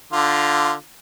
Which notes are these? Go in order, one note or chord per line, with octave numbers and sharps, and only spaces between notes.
D3 F4